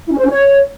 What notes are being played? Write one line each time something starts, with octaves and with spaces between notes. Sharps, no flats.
E4
C#4
C5
C#4
C#5